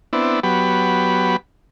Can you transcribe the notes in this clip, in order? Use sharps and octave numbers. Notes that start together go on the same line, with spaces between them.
B3 C4 D4 E4
F#3 B3 G4 B5